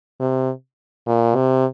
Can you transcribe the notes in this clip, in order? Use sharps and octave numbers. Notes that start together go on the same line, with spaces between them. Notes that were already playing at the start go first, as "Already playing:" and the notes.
C3
A#2
C3